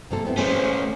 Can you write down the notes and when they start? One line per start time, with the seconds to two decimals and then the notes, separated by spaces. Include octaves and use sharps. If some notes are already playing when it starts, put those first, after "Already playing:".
0.10 C3 A#3 A4
0.25 B3 C4 E4
0.37 A3 A#3 C#4 G#4 C5